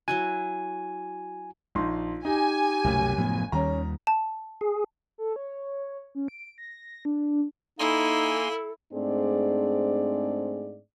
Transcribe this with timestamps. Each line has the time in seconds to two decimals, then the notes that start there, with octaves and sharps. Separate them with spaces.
0.08 F#3 E4 F#4 G#5
1.75 A#1 D#4 C6
2.25 D#4 G4 G#5
2.84 F#1 C2 B2 A3
3.18 A2 F3 B3
3.52 D#2 D#3 G3 C#4 A#5
4.07 A5
4.61 G#4
5.18 A4
5.36 C#5
6.15 C#4
6.28 D7
6.58 A#6
7.05 D4
7.79 A#3 D#4 E4 A4 G#5 C6
8.93 G#2 A3 C4 D4 G#4 D5